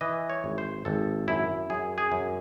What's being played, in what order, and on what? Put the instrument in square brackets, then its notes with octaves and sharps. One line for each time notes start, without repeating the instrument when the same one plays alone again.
[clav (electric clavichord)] E3 D#5
C#5
G#1
C5
G#1 A4
F#2 E4
F#2 G#4
G#4
F#2